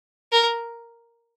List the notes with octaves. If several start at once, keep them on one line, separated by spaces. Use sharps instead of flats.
A#4